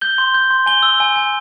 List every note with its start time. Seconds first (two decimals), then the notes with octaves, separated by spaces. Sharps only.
0.01 G6 G7
0.18 C6
0.34 G6
0.50 C6
0.66 G#5 G7
0.83 E6
1.00 G#5
1.16 G#5